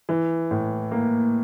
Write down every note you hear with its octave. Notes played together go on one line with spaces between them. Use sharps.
E3
A2
A#3